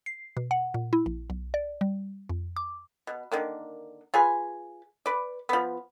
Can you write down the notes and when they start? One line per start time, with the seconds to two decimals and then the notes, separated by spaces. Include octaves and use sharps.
0.06 C7
0.37 B2
0.51 F#5
0.74 A#2
0.93 E4
1.06 A#1
1.30 B1
1.54 D5
1.81 G3
2.29 F2
2.57 D6
3.07 B2
3.32 D3 D#3 A#3
4.14 F4 G#4 B4 G#5
5.06 B4 D5
5.49 F3 B3